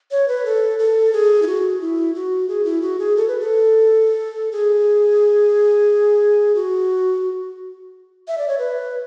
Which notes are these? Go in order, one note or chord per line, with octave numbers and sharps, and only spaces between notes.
C#5
B4
A4
A4
G#4
E4
F#4
E4
F#4
G#4
E4
F#4
G#4
A4
B4
A4
G#4
F#4
E5
D5
C#5
B4